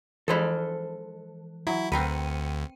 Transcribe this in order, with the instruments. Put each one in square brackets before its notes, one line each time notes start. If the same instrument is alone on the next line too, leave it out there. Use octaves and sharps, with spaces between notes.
[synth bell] E3 [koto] F3 G#3 E4 [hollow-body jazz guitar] A4 C5
[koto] F#3 [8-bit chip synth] E4
[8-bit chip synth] D2 [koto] C4 A#4 B4 [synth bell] G5 C#7 D#7